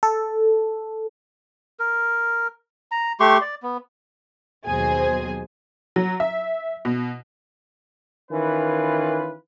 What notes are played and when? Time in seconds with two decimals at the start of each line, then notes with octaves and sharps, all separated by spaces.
0.03 A4
1.80 A#4
2.91 A#5
3.20 A3 G4 C6 C#6
3.41 D5
3.62 B3
4.67 D#2 B2 F#3 G#4 C5 G#5
5.96 F#3
6.20 E5
6.85 B2
8.31 D#3 E3 C#4 F4 B4